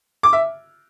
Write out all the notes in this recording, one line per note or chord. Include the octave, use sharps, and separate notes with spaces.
D6
E5